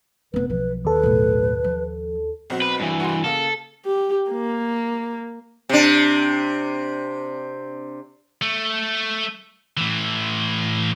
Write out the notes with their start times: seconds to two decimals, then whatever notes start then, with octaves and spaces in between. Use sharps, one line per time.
0.34 F1 B3 B4
0.49 B1 F3 B4
0.85 D#2 A4 B4
1.03 B1 A2
1.64 F3
2.50 B1 C4 F#4
2.62 B4
2.80 G2 E3
3.00 F#4 C6
3.24 C#3 A#3 A4
3.86 G4
4.31 A#3
5.69 C3 D4
8.42 A3
9.77 A2 E3